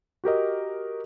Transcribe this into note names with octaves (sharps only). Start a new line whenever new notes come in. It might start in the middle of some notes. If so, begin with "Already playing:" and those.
F#4 G4 A#4 D#5